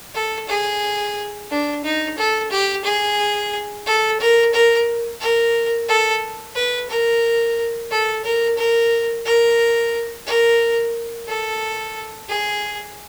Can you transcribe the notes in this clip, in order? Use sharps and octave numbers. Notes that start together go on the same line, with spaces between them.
A4
G#4
D4
D#4
A4
G4
G#4
A4
A#4
A#4
A#4
A4
B4
A#4
A4
A#4
A#4
A#4
A#4
A4
G#4